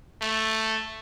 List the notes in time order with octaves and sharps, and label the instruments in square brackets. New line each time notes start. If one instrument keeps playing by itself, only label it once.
[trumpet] A3